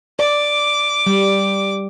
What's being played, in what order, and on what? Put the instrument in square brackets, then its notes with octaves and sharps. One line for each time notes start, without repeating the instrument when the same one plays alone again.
[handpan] D5 [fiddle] D6
[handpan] G3